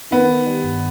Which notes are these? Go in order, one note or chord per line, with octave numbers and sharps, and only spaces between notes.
D#3 B3
D#3
G3
G2